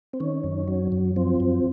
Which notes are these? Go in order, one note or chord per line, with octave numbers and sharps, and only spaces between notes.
C4
D#3 C#4
F#2
F#3
F#2
F3 C4
F#2